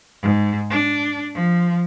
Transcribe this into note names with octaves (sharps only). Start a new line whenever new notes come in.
G#2
D4
F3